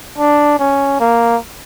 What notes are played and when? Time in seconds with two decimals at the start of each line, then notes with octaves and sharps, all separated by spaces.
0.18 D4
0.59 C#4
1.00 A#3